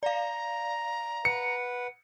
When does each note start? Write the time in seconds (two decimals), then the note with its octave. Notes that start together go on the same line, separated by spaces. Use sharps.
0.03 D5 F5 A#5
1.25 B4 F#5 C#7